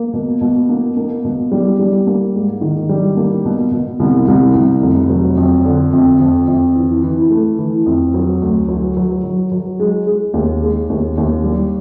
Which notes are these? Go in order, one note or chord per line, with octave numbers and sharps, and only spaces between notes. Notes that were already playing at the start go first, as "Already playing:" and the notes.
Already playing: A#3
B2
B2
A#3
A#3
B2
G3
G3
A#3
G#2
D#3
G3
A#3
B2
B2
C2
C2
C2
F1
F#3
F2
D3
F2
F2
F2
E3
E3
A3
E3
F2
F#3
D2
F#3
F#3
F#3
F#3
G#3
G#3
D#2
G#3
D#2
D#2
G3